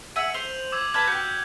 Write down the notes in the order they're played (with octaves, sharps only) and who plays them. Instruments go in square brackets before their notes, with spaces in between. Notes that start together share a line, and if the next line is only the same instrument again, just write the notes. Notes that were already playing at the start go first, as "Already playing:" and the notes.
[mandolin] E5 F#5 G#5 [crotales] D#7 F#7
[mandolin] C5 [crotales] F7
[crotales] D6 E6 G#6
[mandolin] B4 A5 B5 [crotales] F6 F#6 G#6
[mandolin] F#4 G4 [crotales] G6